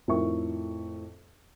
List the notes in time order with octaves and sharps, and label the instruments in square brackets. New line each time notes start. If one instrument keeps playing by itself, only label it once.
[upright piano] F2 A2 D#4 A#4 E5 C#6